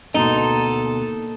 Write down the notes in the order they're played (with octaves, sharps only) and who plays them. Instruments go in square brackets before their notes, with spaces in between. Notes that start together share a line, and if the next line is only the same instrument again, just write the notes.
[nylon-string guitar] D2 B2 [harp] A#3 C6 [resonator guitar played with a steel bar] D#4 [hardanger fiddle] A4